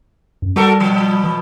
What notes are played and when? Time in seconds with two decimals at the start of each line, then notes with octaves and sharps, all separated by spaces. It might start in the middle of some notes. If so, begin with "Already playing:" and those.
0.42 F#2
0.56 G3 F#4 A4 A#4
0.80 B2 F3
1.24 E3